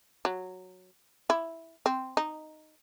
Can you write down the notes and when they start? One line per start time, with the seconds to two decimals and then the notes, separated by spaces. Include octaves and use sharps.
0.25 F#3
1.30 E4
1.86 C4
2.17 D#4